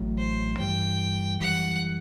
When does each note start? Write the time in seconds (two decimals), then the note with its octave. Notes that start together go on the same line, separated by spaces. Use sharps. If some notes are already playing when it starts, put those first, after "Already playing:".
Already playing: A1 A2 F#3
0.18 C5
0.59 G2 E3 G3 G5
1.41 F#2 E3 G3 F#5